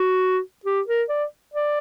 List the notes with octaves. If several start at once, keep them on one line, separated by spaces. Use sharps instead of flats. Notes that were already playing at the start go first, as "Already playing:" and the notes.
Already playing: F#4
G4
A#4
D5
D5